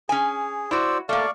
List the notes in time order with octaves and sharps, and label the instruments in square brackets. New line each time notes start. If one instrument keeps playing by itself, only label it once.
[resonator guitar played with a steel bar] C#4 G#5 [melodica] G#4
[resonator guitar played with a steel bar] E4 F#4 [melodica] C5 D5 E6
[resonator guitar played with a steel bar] A3 A#3 [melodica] D5 F5 C#6